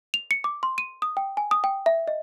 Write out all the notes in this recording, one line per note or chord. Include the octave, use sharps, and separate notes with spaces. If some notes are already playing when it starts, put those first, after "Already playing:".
F7
C#7
D6
C6
D#7
D#6
G5
G#5
D#6
G5
E5
D#5